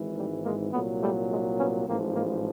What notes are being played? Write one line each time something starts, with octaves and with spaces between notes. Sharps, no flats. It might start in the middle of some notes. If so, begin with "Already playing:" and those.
Already playing: G#1 G#2 E3
G3 A3
G#3 A#3
C2 A#2 F#3 A3 B3
G3 A3
G#3
B3 C#4
A1 G#2 F3 A#3 C4
G#3 A#3